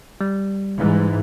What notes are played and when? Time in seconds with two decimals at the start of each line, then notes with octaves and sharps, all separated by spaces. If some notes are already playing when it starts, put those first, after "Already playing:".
0.21 G3
0.77 G#2 E3